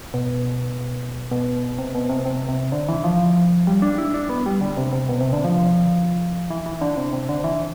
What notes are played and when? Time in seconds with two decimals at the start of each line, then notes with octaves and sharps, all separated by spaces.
0.14 B2
1.31 B2
1.78 C3
1.95 B2
2.09 C3
2.26 C3
2.49 C3
2.72 D3
2.89 E3
3.04 F3
3.67 G3
3.82 D4
3.98 E4
4.14 D4
4.30 B3
4.46 G3
4.61 D3
4.77 C3
4.93 C3
5.09 B2
5.21 C3
5.33 D3
5.44 F3
6.50 E3
6.66 E3
6.81 D3
6.97 C3
7.13 C3
7.29 D3
7.44 E3